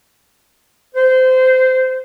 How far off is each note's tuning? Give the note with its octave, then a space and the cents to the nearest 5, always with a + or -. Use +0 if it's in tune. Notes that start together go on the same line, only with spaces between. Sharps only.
C5 -20